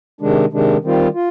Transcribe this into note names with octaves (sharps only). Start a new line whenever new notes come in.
C3 D#3 G#3 D4
C3 D#3 G#3 D4
D#3 G3 C4 F4
F4